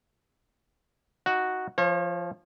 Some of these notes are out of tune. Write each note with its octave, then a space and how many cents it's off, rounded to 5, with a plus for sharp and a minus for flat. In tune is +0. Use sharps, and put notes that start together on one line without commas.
D#4 +15 F#4 +0
F3 -15 C#5 -45